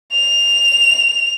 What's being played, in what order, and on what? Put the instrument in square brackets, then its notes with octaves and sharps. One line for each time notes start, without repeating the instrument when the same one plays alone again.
[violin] F7